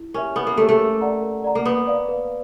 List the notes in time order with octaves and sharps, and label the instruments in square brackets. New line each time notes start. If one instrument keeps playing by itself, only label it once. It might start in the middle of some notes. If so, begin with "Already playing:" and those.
Already playing: [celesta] E4
[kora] C#4 [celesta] G4 A#4 C#5 E5
[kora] B3 [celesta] E4
[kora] A#3
[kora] A3 [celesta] G4 A#4 C#5 E5
[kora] A3
[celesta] A#4
D5 F#5 A#5
A#4
D5 F#5 A#5
[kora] A#3
[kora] B3 [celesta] B4
[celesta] D5 F5
B4